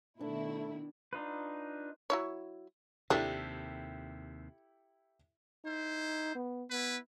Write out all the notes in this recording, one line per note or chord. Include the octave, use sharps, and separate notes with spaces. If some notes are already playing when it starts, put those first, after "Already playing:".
B2 D#3 A3 D4 E4
D4 D#4 F4 B4
F#3 E4 C#5
D#2 C3 D4 E4 G4 A4
D#4 E4 C5
B3
B3 E4 B4